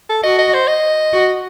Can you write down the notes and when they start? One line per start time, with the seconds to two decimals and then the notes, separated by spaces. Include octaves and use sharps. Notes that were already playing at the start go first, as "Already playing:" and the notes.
0.09 A4
0.23 F#4 D#5
0.38 D#5
0.54 C5
0.68 D#5
1.13 F#4